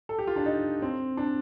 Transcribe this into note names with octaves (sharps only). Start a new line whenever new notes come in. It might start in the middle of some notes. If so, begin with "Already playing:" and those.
A4
G4
F4
D4
D#4
C4
D4